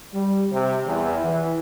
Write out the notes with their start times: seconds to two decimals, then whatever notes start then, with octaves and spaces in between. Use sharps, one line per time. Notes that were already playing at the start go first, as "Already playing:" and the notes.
0.13 G3
0.52 C3
0.87 E2
1.23 E3